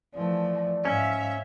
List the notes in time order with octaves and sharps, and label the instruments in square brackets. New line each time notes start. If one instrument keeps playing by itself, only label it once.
[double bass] E3 A3 [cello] F3 [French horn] D5
[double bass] G#2 [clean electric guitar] C#4 [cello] E5 F5